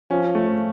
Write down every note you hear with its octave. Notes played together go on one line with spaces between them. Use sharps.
F3 C#4
A3